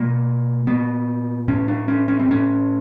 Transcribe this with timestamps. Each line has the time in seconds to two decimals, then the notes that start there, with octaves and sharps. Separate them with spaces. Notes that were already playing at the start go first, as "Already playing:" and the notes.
Already playing: B2 A#3
0.67 A#2 B3
1.48 A2 C#4
1.68 D4
1.88 C#4
2.08 C#4
2.20 C4
2.28 A2 C#4